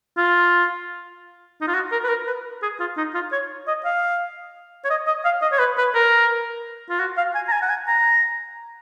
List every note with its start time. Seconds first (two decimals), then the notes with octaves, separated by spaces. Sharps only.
0.17 F4
1.61 D#4
1.67 F4
1.74 F#4
1.92 A#4
2.04 B4
2.09 A#4
2.27 B4
2.63 G#4
2.80 F4
2.97 D#4
3.14 F4
3.32 C#5
3.67 D#5
3.85 F5
4.85 C#5
4.90 D#5
5.07 D#5
5.25 F5
5.42 D#5
5.52 C#5
5.59 B4
5.78 B4
5.95 A#4
6.90 F4
7.00 F#4
7.17 F5
7.35 G#5
7.48 A#5
7.52 G#5
7.62 F#5
7.70 G#5
7.88 A#5